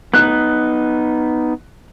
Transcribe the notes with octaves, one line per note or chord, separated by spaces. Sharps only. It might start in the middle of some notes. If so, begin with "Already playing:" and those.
B3 D#4 F#6